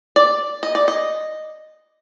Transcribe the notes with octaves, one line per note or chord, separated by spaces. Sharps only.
D5
D#5
D5
D#5